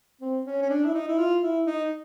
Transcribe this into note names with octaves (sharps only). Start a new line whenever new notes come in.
C4
C#4
C#4
D4
E4
D#4
E4
F4
E4
D#4